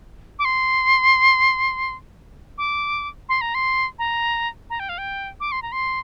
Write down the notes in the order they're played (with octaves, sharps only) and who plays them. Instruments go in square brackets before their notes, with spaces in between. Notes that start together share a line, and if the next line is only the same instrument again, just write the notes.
[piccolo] D6
C6
D6
C6
A#5
C6
A#5
A#5
G5
F5
G5
D6
C6
A#5
C6